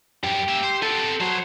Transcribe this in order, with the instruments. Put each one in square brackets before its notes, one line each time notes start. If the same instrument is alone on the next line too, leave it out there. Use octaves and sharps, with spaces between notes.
[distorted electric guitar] F#2 G3 [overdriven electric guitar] G4
[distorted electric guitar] A#3 E5
C5
[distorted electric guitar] B3 C4 [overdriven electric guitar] A4
[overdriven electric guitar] F#3 [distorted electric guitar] C5 C#5